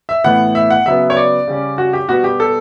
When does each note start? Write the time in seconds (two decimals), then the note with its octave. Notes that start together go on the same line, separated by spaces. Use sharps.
0.09 E5
0.24 A2 E3 B3 F#5
0.55 E5
0.70 F#5
0.86 C#3 F#3 B3 E5
1.10 C#5
1.17 D5
1.48 C#3 G3 C#4
1.78 F#4
1.93 G4
2.09 B2 G3 B3 F#4
2.24 G4
2.40 A4